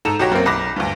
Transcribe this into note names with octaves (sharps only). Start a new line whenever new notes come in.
G#2 A4 A#5 E7
B1 F#4 G4 C#5 A#6
F#2 A#3 C4
B1 B5 D6 A#6
D2 G2